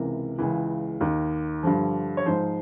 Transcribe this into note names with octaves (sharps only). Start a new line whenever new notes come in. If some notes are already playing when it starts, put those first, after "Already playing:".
Already playing: C#2 C3 E3 A#4
C#2 C#3 E3
D#2 D#3
G2 D3 F3
C#5
G#2 F3 C5